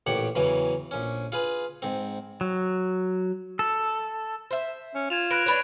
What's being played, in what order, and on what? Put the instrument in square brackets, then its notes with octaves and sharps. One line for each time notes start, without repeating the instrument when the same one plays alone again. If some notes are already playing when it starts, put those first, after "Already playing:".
[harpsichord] A1 A#2 G4 C#5 F#5
E2 C#3 E3 F#3
A#1 C#4
F4 G#4 B4
G#2 C4
[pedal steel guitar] F#3
A4
[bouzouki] C5 E5
[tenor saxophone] C#4
[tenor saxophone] F4 [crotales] G#6 E7 F7
[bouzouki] B4 [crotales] F#6 A#6 D7
[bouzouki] D4 B4 C#5